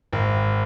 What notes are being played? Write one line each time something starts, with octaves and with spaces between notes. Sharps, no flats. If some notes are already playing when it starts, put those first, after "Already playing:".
G#1